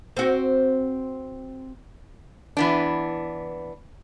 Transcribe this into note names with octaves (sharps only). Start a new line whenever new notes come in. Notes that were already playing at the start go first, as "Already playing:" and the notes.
C4 F#4
E3 B3 D4